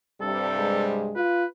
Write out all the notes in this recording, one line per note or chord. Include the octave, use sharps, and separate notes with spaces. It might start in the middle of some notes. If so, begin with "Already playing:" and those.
G2 C3 G3 A4
G#3
F4 B4